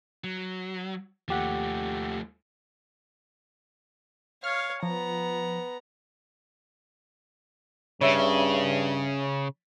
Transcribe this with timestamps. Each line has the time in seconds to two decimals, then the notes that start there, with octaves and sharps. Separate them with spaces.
0.24 F#3
1.28 D#2 F3 A3 G4 F#5
4.44 C#5 F5 F6 G#6
4.83 F3 B3 A#5
8.01 G2 C#3 C#5 E5